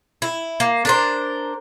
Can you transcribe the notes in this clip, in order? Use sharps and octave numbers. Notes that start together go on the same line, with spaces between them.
E4
A#3
D4 A#4 C5